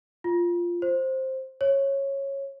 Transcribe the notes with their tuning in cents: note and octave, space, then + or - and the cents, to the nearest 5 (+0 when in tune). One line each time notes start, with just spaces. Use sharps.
F4 -5
C5 +10
C#5 -15